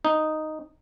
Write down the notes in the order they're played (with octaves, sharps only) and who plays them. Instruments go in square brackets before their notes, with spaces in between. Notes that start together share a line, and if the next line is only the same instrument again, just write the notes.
[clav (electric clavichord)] D#4